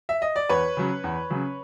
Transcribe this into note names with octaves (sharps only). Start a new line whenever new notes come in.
E5
D#5
D5
E2 B4 C#5
C#3 F#3
E2
C#3 F#3